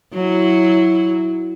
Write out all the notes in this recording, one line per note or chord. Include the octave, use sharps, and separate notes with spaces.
F#3 E4